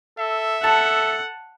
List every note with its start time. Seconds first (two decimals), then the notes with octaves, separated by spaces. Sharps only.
0.19 A4 E5
0.64 A4 F#5 A5